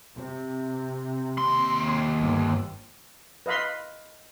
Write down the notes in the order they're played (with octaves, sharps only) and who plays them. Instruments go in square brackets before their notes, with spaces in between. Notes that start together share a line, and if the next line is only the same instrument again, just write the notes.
[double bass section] C3
[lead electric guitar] D#2 C6
[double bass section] G1
[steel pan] B4 D#5 F5 B5 C6